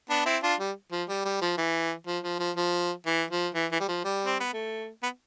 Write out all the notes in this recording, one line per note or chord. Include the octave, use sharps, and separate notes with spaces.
B3 D4
C4 E4
D4 F4
G3
F3
G3
G3
F3
E3
F3
F3
F3
F3
E3
F3
E3
E3
G3
F3
G3
C4
B3
A3
B3